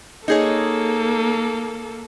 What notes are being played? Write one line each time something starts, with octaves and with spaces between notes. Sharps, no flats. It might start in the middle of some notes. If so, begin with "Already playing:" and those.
A#3 D#4 G#4 A4 C#5